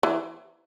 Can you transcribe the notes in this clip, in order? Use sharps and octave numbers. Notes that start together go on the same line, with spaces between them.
E3